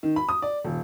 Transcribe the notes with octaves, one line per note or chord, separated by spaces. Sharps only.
D#3
B5
D#6
D5
D#1